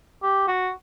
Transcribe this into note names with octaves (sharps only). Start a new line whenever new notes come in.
G4
F#4